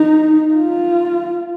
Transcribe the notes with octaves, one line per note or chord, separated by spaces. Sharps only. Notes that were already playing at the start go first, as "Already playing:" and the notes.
Already playing: D#4
F4